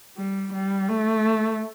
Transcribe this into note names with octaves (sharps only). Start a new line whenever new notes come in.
G3
G3
A3